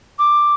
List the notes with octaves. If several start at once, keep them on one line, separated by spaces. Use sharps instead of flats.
D6